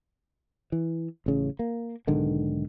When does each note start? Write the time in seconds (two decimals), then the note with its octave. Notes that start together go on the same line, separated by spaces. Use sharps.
0.72 E3
1.26 A1 C#3
1.59 A#3
2.07 B1 G#2 D3 D#3